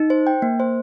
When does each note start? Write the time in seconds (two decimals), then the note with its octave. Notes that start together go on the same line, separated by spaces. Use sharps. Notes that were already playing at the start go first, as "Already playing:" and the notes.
Already playing: D#4
0.10 C5
0.27 G5
0.42 A#3
0.60 C5